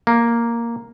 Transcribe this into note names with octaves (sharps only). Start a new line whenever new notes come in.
A#3